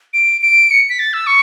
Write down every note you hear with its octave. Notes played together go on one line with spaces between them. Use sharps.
D7
D7
C#7
B6
A6
E6
C#6